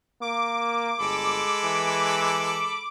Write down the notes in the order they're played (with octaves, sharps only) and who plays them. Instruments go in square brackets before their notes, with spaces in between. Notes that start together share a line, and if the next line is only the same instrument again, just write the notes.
[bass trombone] A#3 [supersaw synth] D6
[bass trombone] G1 [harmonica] G#3 A4 B5
[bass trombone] E3